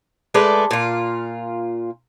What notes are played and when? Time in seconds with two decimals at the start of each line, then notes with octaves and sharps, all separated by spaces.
0.34 G#3 A3 B4 D5
0.71 A#2 F4